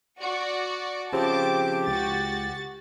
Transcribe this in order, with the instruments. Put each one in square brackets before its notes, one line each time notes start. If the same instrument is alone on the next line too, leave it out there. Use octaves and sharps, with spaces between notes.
[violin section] F#4 D5 C#6
[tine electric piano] C#3 F3 C4 [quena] G4 [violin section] A5 D6
[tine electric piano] C#2 [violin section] F#4 A6